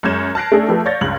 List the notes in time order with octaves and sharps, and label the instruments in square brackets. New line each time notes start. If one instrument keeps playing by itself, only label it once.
[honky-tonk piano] F#2 G#3 C#5 G6 G#6 E7
A5 F6 F#6 A#6 C7 D7
A3 C#4 D4 G#4 A4
F3 A3 G4 A4 B4
C#5 D5 F5 G6 A6 A#6
C#2 G2 G#6 F#7